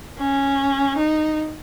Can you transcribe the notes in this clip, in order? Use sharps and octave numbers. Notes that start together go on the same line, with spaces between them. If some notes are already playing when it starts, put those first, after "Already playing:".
C#4
D#4